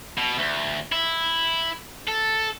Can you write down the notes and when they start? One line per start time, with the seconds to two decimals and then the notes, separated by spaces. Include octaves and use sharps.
0.18 B2
0.38 D2
0.92 E4
2.07 A4